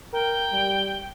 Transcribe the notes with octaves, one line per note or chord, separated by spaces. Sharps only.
A#4 G5
G3